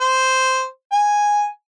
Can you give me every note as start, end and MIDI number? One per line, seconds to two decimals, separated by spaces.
0.01 0.65 72
0.92 1.47 80